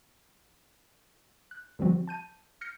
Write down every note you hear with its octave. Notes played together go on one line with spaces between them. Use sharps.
F#6
D3 E3 F3 G3 C4 F#4
A5 G6 D#7
F6 G6 A#6 C7 C#7